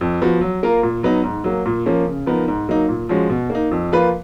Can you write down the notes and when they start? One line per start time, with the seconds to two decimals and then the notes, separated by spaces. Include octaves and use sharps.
0.01 F2
0.22 F3 B3 F#4
0.41 F#3
0.63 A#3 F4 A#4
0.83 A#2
1.03 F#3 B3 D#4
1.23 G#2
1.44 F#3 A#3
1.66 A#2
1.86 F3 A#3 C#4
2.06 C#3
2.26 F3 B3 D#4 A#4
2.48 G#2
2.69 F#3 A#3 D#4
2.89 A#2
3.09 F3 G#3 C#4 F#4
3.30 B2
3.50 A#3
3.55 D#4
3.71 F2
3.92 F3 A#3 F4 B4